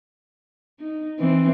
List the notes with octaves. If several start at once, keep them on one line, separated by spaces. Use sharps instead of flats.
D#4
E3 C4